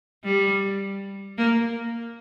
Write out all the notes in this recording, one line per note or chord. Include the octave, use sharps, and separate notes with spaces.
G3
A#3